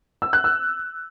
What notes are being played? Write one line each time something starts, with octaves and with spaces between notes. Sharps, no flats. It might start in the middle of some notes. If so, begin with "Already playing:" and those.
E6
F#6
E6